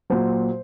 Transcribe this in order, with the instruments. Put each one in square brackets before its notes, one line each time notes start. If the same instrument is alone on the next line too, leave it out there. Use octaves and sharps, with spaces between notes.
[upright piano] A#2 F#3 C5